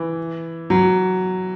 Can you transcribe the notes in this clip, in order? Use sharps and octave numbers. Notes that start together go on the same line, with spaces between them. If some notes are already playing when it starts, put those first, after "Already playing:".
Already playing: E3
F#3